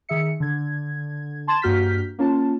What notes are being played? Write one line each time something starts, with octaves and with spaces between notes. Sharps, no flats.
D#3 G#4 E5 C#7
D3 G#6
A5 C6 G#6 A6 E7
G2 A#3 F#4 F6 G6 B6
A#3 C#4 F4 A5